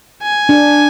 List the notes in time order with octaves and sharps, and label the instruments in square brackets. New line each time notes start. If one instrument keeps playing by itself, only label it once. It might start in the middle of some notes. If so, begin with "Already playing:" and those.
[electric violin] G#5
[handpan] D4